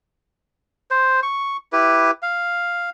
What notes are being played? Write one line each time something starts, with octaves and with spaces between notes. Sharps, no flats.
C5
C#6
E4 G4 B4
F5